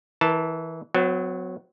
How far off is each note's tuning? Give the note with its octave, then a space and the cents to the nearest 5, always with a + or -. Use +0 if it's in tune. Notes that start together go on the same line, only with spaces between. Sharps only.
E3 -20 A#4 +10 A5 +0
F#3 -15 B3 +45